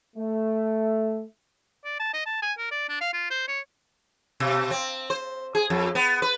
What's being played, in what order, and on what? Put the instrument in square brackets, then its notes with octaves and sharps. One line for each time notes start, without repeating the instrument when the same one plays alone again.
[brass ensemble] A3
[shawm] D5
A5
D#5
A5
G#5
A#4
D5
D4
F5
F4
C5
C#5
[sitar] B2
C4
C5
G#4
F2
B3
B4